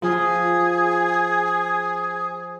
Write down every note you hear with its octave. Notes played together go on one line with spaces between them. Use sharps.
F3 F4 G#4